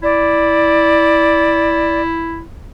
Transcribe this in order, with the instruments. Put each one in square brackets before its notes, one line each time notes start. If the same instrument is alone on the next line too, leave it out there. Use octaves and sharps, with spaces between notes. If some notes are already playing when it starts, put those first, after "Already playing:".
[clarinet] E4 [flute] D5